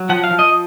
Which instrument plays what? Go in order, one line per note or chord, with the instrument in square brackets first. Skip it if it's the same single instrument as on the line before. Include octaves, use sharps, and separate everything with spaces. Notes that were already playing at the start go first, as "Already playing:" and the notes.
Already playing: [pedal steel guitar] F#3
F3 F#5
F5
F3
D#5